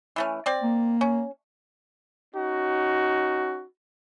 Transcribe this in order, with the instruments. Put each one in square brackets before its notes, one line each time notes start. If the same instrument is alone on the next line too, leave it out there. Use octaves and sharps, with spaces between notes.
[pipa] E3 A3 C#4
C4 D5
[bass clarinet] A#3
[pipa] C#4
[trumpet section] C#4 D#4 F#4